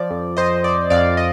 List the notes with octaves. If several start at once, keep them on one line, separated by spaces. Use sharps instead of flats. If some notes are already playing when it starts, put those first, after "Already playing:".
Already playing: F3 D5
F2
F2 C5 D#5
F2 D5
F2 D5 F5
D#5